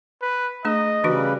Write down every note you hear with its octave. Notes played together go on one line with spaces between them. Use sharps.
B4
A3 D4 G#4 D#5
C#3 E3 G3 D4 F#4 B4